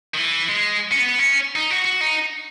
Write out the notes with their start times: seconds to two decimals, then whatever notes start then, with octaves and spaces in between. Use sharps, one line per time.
0.14 D#3
0.18 E3
0.49 G#3
0.92 C#4
0.99 B3
1.19 C#4
1.55 D#4
1.70 F#4
1.85 F#4
2.01 D#4